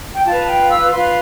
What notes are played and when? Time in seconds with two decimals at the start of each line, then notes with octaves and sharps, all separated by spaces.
0.15 G5
0.26 F4 B4 A5
0.48 G5
0.69 E6
0.91 F4 B4 C6